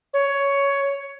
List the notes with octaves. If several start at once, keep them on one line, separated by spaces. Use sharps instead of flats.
C#5